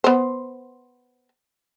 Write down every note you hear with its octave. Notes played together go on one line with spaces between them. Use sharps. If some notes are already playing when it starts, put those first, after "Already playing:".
B3 C5